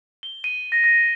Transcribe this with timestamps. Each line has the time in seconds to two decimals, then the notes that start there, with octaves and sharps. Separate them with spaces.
0.23 G7
0.44 D#7
0.72 A#6
0.84 A#6